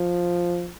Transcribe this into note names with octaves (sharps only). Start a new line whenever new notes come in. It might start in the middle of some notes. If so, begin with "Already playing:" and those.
Already playing: F3